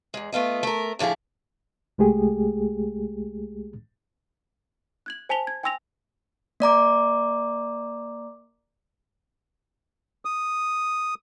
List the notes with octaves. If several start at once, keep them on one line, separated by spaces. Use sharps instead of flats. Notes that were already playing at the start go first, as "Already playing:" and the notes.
E2 G#3
A3 B3 F4 D#5
A3 A#4
A2 D3 F3 E4 G#4
C2 G#3 A3 G4 G#4
F#6 G#6 F#7
C5 G#5 A5 B6 F7 G7
G#6
G5 G#5 C6 E6 A#6 F7
A#3 D5 A#5 D6
D#6